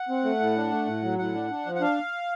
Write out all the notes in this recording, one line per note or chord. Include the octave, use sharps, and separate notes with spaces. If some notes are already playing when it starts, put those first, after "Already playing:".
Already playing: F#5
C4
A3
A2
D4
A3
A2
F#3
A2 F#5
D4
D4
F3
F#5
D4 F5